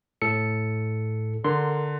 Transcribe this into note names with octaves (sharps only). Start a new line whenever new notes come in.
A2 A4 C#7
D3 A#4 C6